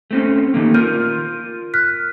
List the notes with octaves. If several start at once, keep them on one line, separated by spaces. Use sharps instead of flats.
A3 C4 C#4
D#3 A3 A#3
F4 A#4 F6 G6
F6 F#6 B6